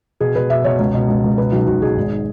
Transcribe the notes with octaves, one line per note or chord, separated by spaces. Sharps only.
B2 G#4
B2 B4
B2 E5
B2 C#5
C#2 C#5
B2
C#2
C#2
B2 B4
B1 F#4
B1 F#4
B2 G#4
G#1